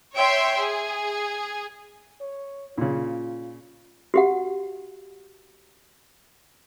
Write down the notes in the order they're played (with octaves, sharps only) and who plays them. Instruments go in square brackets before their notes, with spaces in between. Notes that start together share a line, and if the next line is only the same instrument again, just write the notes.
[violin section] C#5 E5 G5 C6
G#4
[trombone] C#5
[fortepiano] A#2 C#3 [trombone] F4
[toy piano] F#4 G4 F#5